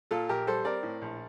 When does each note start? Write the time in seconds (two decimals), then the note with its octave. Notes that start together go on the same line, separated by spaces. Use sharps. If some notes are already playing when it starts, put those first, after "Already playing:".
0.11 A#2 F4 A4
0.29 A#1 G4 A#4
0.47 G3 A4 C5
0.65 C4 A#4 D5
0.83 A2
1.02 A#1